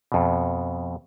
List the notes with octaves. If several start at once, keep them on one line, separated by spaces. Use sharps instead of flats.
F2 B2